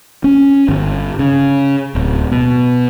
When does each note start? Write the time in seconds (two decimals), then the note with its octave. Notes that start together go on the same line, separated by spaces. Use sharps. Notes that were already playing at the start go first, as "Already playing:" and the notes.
0.24 C#4
0.68 G1
1.19 C#3
1.95 D1
2.31 B2